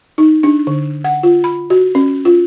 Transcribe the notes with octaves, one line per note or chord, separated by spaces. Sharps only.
D#4
D4
D3
F#5
F4
B5
F#4
C#4
F4